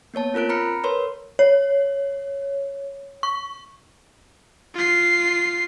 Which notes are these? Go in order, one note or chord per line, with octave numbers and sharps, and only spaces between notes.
A#3 B3 C#5 A5
C4 F4 A#4 F#6 D7
A#5 B5 F6 C#7
A#4 B4 C#5 C6
C#5
C#6
F4 C7